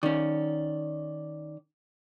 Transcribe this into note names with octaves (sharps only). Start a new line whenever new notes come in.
D#3 C#4 D5